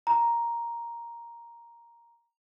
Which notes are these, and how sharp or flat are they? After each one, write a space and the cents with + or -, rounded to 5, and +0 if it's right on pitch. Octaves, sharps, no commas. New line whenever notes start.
A#5 +5